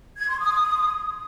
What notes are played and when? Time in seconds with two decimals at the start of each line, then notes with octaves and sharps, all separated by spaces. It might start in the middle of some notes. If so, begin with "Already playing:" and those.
0.18 G#6
0.29 C6
0.39 D#6